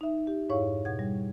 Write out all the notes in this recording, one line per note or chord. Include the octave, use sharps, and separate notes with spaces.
D#4 E5
G4
F2 G#2 E4 C#5 F5 C#6
B2 F#5 G#6
G3